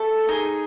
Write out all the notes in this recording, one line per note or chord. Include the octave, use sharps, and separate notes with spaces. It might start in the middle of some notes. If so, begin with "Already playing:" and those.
Already playing: A3 A4
D#4 G#4